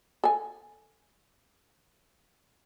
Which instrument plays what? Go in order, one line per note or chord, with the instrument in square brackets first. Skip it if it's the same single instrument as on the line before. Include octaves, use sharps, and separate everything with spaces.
[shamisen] A4 G#5